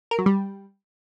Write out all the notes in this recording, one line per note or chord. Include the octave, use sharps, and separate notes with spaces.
A#4
F#3
G3